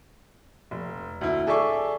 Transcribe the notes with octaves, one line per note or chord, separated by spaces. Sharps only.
F1
D2 E4
G#4 A4 D5 E5 C#6 D6